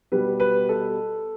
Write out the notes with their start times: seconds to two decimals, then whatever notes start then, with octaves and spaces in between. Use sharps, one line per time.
0.12 B2 G3 B4
0.40 B4
0.69 A4